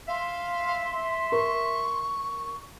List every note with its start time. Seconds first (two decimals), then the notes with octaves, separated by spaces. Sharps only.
0.08 E5 F5 C6
1.32 A#4 C#6